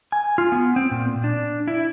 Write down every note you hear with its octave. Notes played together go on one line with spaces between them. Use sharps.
G#5
F4
B3
C4
A#2
D4
E4